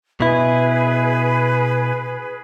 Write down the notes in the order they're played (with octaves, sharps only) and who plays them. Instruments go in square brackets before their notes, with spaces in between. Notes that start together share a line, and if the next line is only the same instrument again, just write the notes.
[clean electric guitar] B2 E4 [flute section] G#4 B4